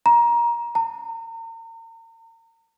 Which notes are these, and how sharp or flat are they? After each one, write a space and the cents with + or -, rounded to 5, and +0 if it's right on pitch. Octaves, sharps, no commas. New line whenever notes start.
A#5 +20
A#5 -40